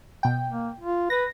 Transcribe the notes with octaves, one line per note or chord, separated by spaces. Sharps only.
B2 G5
A#3
F4
B4 A#6